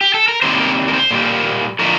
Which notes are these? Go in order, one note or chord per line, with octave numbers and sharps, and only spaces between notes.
G4
A4
A#4
C3 D#3 G3 A#3 C5
A#4
A#4
C5
A#2 G3 A#3
D3 F3 A3 A#4